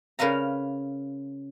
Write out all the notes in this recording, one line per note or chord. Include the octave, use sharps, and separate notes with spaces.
C#3 A#4 B4 F5 A#5